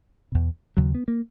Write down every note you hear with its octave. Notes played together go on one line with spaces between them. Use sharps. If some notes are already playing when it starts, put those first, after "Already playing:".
E2 B2
D#2 C#3 F#3
B3
A#3